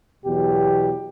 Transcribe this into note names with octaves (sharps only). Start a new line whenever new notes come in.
E2 B2 F#3 G4